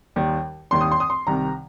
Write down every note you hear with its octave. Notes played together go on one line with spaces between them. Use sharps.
D#2 D#3 G3
D#2 D#3 G3 C6
D#6
C6
D#6
C6
C2 C3 D#3 A#5